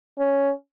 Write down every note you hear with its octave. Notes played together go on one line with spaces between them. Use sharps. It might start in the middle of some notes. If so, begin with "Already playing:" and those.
C#4